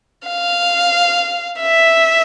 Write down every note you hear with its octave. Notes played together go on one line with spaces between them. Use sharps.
F5
E5